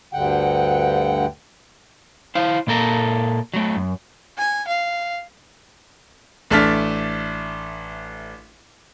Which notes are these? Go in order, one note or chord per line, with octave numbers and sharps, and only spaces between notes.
D2 G2 D3 F#5 G5
E4 C5 F5
A#2 A#3 A4 A#5
F#3 A3
F#2
G#5
F5
A1 A3 D4 A5 F6 B6